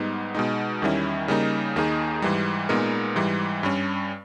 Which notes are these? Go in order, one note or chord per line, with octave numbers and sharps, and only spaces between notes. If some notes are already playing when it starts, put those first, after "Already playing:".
Already playing: G#2 G3 B3 D#4
B2 G#3 D#4
E2 D#3 G3 C#4 E4
C#3 G3 A#3 D#4
D#2 D#3 A#3 D#4 G#4
G#2 E3 G3
A#2 G#3 B3 D#4 A#4
G#2 E3 G3
G2 G3 C#4